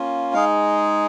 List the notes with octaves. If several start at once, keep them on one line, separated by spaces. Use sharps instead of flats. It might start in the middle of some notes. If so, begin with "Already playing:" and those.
Already playing: A#3 C#4 F4
G#3 D#4 G#4 F5